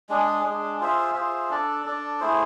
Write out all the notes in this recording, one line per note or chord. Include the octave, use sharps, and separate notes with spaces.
G#3 D4 G#4
G#3 D4 G#4
F4 G#4 C5 E5
F4 G#4 C5 E5
D4 A4 D5
D4 A4 D5
A3 E4 G#4 C5